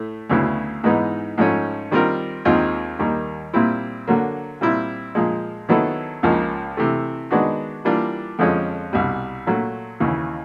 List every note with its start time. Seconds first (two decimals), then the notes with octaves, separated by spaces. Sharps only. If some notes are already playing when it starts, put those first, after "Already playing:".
Already playing: A2 A3
0.30 D2 C#3 F#3 B3 E4
0.84 G#2 E3 G#3 B3 D#4
1.38 G#2 F3 A3 C#4
1.91 D#3 G3 C4 F4 A#4
2.45 D#2 D#3 G#3 C4 F4
2.99 D#2 D#3 G3 A#3
3.54 A#2 G3 C4 E4
4.07 D3 F#3 A#3
4.61 A#2 G3 C4 E4
5.15 A#2 F3 G#3
5.69 D#3 F#3 B3 E4 A4
6.23 C#2 C#3 F3 A#3 D#4
6.77 C3 E3 A3
7.31 D#3 G#3 B3 D4 F#4
7.85 E3 G3 A#3 D4 F4
8.39 F2 D3 F3 G#3 C#4
8.93 C2 B2 G3
9.47 A#2 F#3 A3
10.00 D#2 C#3 E3